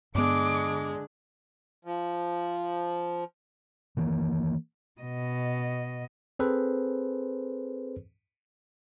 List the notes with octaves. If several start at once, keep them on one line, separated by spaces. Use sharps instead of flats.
G2 D3 G#3 B3 D4 D6
F3
D#3 E3 A#3
B2 D#5
C4 G#4 A4 B4 C5